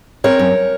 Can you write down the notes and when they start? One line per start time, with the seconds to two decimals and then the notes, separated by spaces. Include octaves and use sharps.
0.24 C4 A#4 C#5
0.39 F#2